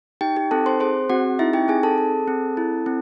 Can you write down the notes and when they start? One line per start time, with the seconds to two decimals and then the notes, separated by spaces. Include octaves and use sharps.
0.21 D#4 G4 G5
0.36 G4 G5
0.51 C4 A4 A5
0.66 C5 C6
0.80 G#4 C5 C6
1.09 C4 F#4 F#5
1.39 D#4 E4 E5
1.53 G4 G5
1.68 C4 G#4 G#5
1.83 A4 A5
1.98 G#4
2.28 C4
2.57 E4
2.86 C4